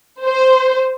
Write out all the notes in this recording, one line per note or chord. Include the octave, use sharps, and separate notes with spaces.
C5